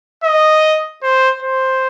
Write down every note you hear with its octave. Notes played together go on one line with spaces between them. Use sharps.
D#5
C5
C5